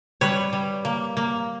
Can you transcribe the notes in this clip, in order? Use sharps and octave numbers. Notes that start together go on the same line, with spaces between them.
G3 B4 C#5
G3
A#3
A#3